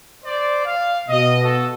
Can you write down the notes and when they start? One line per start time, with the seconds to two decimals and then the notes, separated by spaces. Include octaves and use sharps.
0.24 C5 D5
0.66 F5
1.09 B2 D#5
1.43 F#4 A4